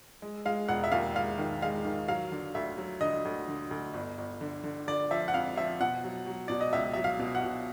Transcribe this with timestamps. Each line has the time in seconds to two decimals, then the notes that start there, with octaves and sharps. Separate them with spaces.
0.22 G#3
0.45 G#3 F5
0.68 E1 F#5
0.84 E5
0.92 D#2 F5
1.15 G#3 F5
1.38 D#3
1.62 G#3 F5
1.85 D#3
2.08 F#3 F5
2.31 D3
2.55 D2 E5
2.77 F#3
3.01 D3 D#5
3.25 D2
3.48 D3
3.71 D2
3.94 G1
4.18 G1
4.41 D3
4.64 D3
4.87 D3 D5
5.11 F3 E5
5.28 F#5
5.34 F2 F5
5.57 F3 E5
5.80 B2 F#5
6.04 F#3
6.26 F#3
6.48 B2 D5
6.61 D#5
6.73 C#2 E5
6.94 F#3 E5
7.04 F5
7.19 B2
7.35 F#5
7.43 B2